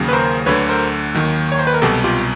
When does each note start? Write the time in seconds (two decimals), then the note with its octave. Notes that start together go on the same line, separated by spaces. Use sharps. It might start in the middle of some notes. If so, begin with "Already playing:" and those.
Already playing: D#2 C#3 F#3
0.09 B4
0.13 A#4 C5
0.46 D2 D3 F#3 B4 C#5
0.69 A#4 C5
1.15 D#2 D#3 F#3
1.52 C#5
1.59 C5
1.67 B4
1.74 A#4
1.82 C2 B2 F#3 G4 A4
2.04 F4 G4